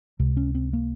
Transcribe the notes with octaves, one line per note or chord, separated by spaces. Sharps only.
C#2 C3
C#4
C4
A#3